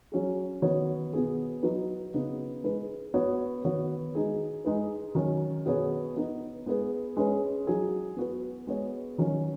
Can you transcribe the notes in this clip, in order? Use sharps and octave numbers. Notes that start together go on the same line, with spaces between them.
F#3 C#4 G#4
D#3 B3 F#4 C#5
B2 B3 G#4
F#3 D#4 F#4 B4
C#3 B3 D#4
G#3 D#4 B4
B3 F#4 C#5
D#3 B3 F#4 C#5
G#3 D#4 G#4
G#3 D#4 B4
D#3 F#3 C#4
B2 B3 G#4 C#5
B3 D#4 B4
G#3 B3 G#4 B4
G#3 C#4 B4
F#3 D#4 G#4
B3 F#4 B4
G#3 B3 G#4 C#5
D#3 F#3 C#4 F#4